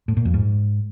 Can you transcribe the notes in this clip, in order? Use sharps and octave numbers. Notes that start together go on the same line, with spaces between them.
A2
A#2
F2
G#2